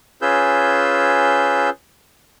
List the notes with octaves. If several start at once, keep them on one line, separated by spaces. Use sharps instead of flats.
C#4 F4 G#4 B4 E6 G6